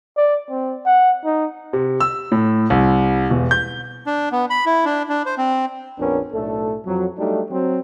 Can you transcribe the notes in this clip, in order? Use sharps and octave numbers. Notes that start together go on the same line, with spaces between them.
D5
C4
F#5
D#4
C3
E6
A2
C2
E1
G6
D4
B3
B5
E4
D4
D4
C5
C4
A#1 F2 B3 C#4 D4 A#4
B1 A2 A3 D4 A4
F2 F#3
F#3 G3 A3 D4 D#4
F#3 C4